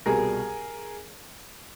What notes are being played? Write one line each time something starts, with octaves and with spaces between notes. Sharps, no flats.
C2 B2 G3 G#4 A#4